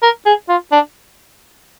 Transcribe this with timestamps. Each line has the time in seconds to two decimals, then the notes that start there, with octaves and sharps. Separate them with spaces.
0.02 A#4
0.26 G#4
0.49 F4
0.72 D4